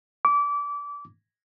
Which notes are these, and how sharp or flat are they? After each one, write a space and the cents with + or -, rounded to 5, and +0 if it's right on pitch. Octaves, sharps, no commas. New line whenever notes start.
D6 -25